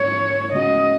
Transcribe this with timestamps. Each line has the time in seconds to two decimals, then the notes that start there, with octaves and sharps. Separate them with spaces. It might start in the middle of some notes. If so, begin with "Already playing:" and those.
Already playing: G#2 A#3 C#4 C#5
0.52 C#3 G#3 C#4 F#4 D#5